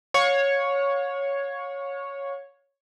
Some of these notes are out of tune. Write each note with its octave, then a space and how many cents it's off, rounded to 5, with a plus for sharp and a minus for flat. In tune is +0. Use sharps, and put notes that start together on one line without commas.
C#5 +0 F5 +40